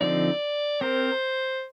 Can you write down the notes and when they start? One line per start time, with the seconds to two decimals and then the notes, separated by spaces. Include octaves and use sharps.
0.01 D3 F3 C4 D#4 D5
0.81 C4 G4 A#4 C5